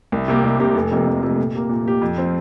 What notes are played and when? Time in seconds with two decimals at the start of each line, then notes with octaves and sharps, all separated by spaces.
0.12 C2
0.28 C3 A#3 G4
0.44 C2
0.60 C3 A#3 G4
0.75 F1
0.91 F2 C3 A#3
1.07 F1
1.23 F2 C3 A#3
1.38 A#2
1.54 A#3 G4
1.69 A#2
1.85 A#3 G4
2.01 F2
2.17 F3 C4